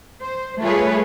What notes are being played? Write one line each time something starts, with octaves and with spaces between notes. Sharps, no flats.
C5
G3 A3 F4 G#4 B4 C#5